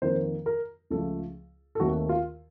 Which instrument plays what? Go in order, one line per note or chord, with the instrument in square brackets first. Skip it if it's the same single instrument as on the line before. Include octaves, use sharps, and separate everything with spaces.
[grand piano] F2 D#3 A#3 C5
A#4
C#2 C#3 F3 A3 A4
A4
D#2 D#3 A3 C4 F#4
F4